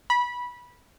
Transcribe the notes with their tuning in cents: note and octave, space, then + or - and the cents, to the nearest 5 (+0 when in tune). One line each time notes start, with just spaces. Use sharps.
B5 -20